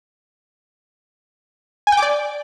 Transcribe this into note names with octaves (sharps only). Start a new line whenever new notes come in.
G#5
G5
D6
D5